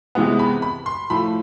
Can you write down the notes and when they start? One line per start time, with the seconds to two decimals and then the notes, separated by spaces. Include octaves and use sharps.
0.15 C3 E3 G#3 B3
0.39 B5
0.62 B5
0.86 C6
1.10 A2 F3 A3 B5